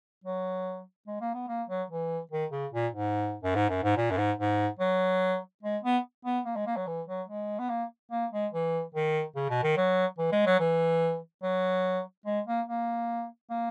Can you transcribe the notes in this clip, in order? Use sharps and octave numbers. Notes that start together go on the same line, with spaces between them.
F#3
G#3
A#3
B3
A#3
F#3
E3
D#3
C#3
A#2
G#2
F#2
G#2
F#2
G#2
A#2
F#2
G#2
G#2
F#3
G#3
B3
B3
A#3
G#3
A#3
F#3
E3
F#3
G#3
B3
A#3
A#3
G#3
E3
D#3
C#3
B2
D#3
F#3
E3
G#3
F#3
E3
F#3
G#3
A#3
A#3
A#3